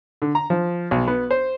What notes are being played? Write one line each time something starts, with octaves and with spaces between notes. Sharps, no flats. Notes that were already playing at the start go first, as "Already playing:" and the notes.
D3
A#5
F3
B1
B3
C5